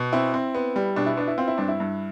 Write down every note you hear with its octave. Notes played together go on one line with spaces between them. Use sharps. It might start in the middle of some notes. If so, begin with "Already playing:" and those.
Already playing: B2
C4 E4
C4
B3
G3
B2 D4
E4
B3 D4
E4
C4 F4
E4
G2 D4
E4
G2